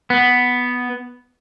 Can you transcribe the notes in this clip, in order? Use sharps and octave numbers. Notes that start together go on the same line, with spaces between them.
B3